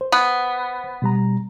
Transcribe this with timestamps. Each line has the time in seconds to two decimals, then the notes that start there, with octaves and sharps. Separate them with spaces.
0.01 C5
0.12 B3
1.02 B2 G3 A#5